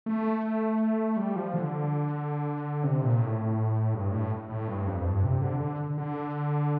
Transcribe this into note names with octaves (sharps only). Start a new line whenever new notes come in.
A3
G3
F3
D3
C3
A#2
A2
G2
A2
A2
G2
F2
G2
C3
D3
D3
D3